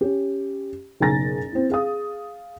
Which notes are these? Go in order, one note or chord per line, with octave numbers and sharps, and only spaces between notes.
C#4 G4
F#1 B1 G#5 A#5 A6 A#6
C4 E4
G#4 F5 D#6